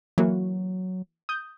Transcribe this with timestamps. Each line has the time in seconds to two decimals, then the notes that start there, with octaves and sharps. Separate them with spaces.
0.18 E3 F#3 A#3 F#4
1.29 D#6 G6